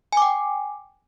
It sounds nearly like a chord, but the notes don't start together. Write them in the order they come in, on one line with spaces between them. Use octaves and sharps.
G#5 D6 G5